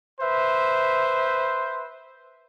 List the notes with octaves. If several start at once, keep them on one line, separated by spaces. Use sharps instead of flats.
B4 C5 E5